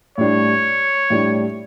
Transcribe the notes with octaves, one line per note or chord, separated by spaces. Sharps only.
A2 G3 D4 C#5
A2 G3 D4